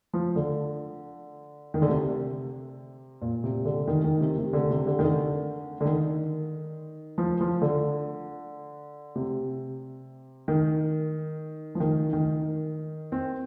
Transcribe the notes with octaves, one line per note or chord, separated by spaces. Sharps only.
F3
D3
D#3
D3
C3
A#2
C3
D3
D#3
D#3
C3
C3
D3
C3
D3
D#3
D3
D3
D#3
F3
F3
D3
C3
D#3
F3
D#3
D#3
C4